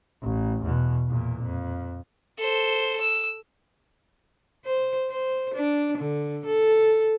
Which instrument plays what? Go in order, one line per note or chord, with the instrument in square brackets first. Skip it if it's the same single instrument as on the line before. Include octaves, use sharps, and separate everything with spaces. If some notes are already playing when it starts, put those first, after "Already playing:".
[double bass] A1
E2 B2
E2 A#2
F2
[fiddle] A4 C5
E6
[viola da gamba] C5
C5
D4
D3
A4